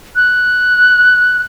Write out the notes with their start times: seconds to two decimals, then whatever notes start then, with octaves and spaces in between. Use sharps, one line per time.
0.16 F#6